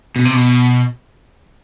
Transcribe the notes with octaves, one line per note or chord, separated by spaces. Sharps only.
B2
C3
B2